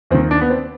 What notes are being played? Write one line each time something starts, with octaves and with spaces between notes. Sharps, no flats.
D#2 D#3 C4
D4
B3
C4